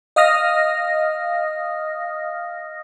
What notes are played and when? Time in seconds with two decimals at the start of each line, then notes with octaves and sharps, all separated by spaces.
0.16 D#5 F5 D#6 F6 A#6